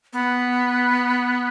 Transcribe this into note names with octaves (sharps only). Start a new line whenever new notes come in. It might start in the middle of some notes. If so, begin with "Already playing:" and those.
B3